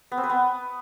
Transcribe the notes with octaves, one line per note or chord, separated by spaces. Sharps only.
B3
C4
B4
B3